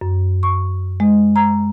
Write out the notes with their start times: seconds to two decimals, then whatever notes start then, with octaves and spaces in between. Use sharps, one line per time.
0.01 F#2
0.43 C#6
1.00 G#3
1.36 A#5